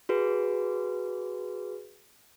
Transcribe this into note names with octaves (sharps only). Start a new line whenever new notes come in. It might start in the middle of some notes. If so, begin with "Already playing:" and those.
F#4 G#4 B4